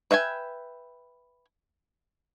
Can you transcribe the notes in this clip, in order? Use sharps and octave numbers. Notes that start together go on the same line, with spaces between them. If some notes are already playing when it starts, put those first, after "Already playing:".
B4 E5 G5 G#5